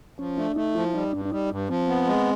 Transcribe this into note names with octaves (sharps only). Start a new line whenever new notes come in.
F3 C#4
A3 D4
A3 D#4
F3 E4
G3 D#4
G2 D4
D4
G3 D#4
G2
F3 C4
B3
G#3